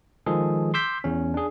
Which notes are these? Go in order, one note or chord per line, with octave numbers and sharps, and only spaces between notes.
D#3 F3 G#3 G#4 A4
C6 D6 E6 G6 B6
E2 C#4
D4 G#4